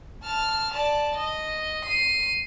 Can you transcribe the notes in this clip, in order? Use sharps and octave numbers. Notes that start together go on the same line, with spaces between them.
A5 F6
D5 A5
D#5
C7 D#7